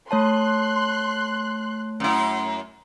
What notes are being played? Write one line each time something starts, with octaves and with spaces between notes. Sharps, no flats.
A3 C#5 A5 C6 F#6
F#2 E4